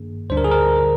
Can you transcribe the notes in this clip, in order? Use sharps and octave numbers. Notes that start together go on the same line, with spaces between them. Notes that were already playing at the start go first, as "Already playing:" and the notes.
Already playing: G2 D#3 A#3 D4 G#4
D2 D3 G3 D4 C5
A#4
G#4
A#4